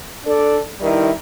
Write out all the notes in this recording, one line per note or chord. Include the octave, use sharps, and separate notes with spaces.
D4 A4 D5
G2 D#3 G3 E4